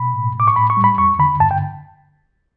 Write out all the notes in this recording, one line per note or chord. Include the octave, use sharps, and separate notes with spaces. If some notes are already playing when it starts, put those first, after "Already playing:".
Already playing: B2 B5
A2
A2 D6
C#6
A2 B5
C#6
G3
B5
E2 C#6
D3 B5
G2 A5
G5